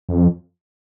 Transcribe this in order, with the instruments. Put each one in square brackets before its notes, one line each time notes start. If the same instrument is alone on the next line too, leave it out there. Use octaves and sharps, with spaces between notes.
[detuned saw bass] F2